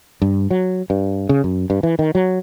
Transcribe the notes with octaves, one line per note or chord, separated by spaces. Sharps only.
G2
F#3
G2
C#3
F#2
G2
E3
D#3
F#3